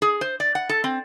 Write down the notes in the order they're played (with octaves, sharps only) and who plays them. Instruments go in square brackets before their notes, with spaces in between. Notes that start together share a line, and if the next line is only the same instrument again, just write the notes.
[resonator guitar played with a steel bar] G#4
C5
D5
F#5
A4
C4